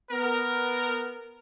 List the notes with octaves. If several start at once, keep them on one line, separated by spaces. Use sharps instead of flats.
B3 A#4